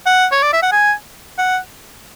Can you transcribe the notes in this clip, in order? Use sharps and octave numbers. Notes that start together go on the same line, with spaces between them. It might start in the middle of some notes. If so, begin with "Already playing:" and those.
F#5
C#5
D5
E5
F#5
G#5
F#5